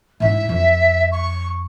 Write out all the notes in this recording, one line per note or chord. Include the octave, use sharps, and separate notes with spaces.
G#2 E4 E5
F2
C#6